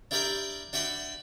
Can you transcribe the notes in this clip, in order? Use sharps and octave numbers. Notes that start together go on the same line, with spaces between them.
D4 E4 G4 A#4 D5 G5
D4 F#4 E5 G5 B5